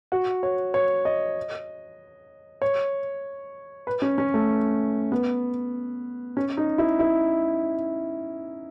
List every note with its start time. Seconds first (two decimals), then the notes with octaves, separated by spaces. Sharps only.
0.12 F#4
0.43 C#5
0.74 C#5
1.05 D#5
2.62 C#5
3.87 B4
4.02 C#4
4.18 C#4
4.34 A3
5.12 B3
6.37 C#4
6.57 D#4
6.78 E4
6.99 E4